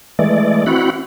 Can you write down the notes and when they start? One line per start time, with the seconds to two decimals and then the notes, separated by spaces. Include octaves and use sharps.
0.19 E3 G#3 A3 D5
0.66 C4 E4 F#4 F#5 B5